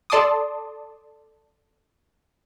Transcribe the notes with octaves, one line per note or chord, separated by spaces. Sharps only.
A4 D5 A5 C6 D6 D#6